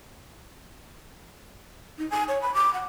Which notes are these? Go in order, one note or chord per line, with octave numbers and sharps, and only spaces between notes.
D#4
G#5
C#5
B5
D6
F#5